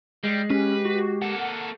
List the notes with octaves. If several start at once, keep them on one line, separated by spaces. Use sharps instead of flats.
G3 G#3
C#4 G4 B4
F#4
A#3 A4 F#5